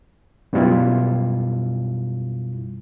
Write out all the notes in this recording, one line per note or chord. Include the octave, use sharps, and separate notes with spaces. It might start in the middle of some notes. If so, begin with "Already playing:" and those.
F#2 B2 G3 E4 F4